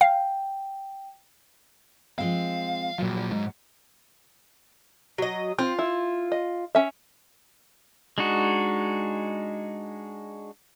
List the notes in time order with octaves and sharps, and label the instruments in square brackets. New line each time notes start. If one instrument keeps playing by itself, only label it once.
[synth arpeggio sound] F5 [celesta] G5
[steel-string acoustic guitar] F3 G#3 C4 [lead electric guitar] F5
[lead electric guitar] A#2 F3 [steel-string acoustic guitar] F#3
[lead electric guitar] G#2
[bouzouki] F#3 D#5
[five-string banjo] C4 [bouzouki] F4
[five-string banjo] E4
D#5
C#4 E5
[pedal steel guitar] G#3 D4 D#4 F#4